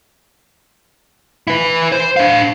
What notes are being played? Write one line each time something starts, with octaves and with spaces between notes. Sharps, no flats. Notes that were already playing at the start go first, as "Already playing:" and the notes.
E4 B4
C5
D4 F5